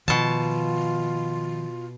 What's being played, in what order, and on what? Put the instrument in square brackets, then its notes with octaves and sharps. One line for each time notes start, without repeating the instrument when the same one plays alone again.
[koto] B2 A5 [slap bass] D#3 F3 [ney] F4